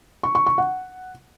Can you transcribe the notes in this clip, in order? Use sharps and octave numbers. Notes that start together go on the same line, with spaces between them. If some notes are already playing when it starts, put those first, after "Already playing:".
C#6
C#6
C#6
F#5